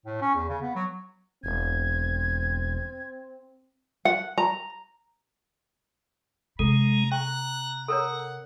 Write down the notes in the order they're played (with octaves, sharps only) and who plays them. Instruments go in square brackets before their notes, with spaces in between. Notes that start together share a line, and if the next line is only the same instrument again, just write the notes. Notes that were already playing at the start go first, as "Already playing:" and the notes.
[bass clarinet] A2
C#4
E2
C#3
B3
F#3
[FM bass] E1 [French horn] C4 [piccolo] G#6
[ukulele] F#5
A#5
[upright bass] C3 [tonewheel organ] G#3 [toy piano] A4 [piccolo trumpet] A#5
[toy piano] G5 [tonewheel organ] A#5 [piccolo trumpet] F#6
[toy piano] A4 A#4 C#5 [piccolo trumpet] F#5